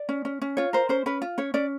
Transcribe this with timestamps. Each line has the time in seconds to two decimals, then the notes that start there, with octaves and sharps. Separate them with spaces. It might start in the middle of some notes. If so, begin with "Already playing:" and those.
Already playing: D5
0.09 C#4
0.25 C#4
0.42 C#4
0.57 F4 C#5
0.73 A#4 C5
0.89 C#4 C5
1.06 C#4 B4
1.22 F4
1.38 C#4 C#5
1.54 C#4 D5